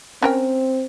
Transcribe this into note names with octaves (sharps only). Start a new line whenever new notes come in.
C4 C#4 A#4 G5